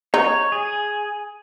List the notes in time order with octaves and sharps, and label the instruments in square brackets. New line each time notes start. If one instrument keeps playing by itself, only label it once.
[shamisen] D#4 [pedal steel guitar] C#5
[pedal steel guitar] G#4